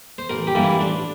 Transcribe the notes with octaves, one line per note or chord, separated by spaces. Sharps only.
C5
A1 A#4
G4
G2 E3 A#3
E4
A1 D4